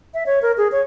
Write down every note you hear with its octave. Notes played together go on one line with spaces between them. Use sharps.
E5
C#5
A#4
G#4
C#5